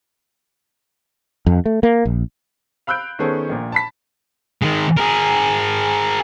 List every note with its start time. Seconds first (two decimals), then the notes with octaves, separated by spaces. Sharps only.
1.46 F2
1.66 A3
1.83 A#3
2.06 A#1
2.87 F5 B5 E6 F#6 G6 D7
3.19 D#3 B3 C#4 G#4 A4 C5
3.49 A#1 A#2
3.72 A5 B5 B6
4.62 D#3 G#3
4.97 G#4 A#4